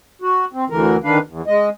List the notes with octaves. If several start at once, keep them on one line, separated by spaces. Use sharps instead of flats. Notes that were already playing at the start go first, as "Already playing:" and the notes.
F#4
C4
D2 D3 E3 A#4
D3 D#3 D4 B4 F5
E2
G#3 D#5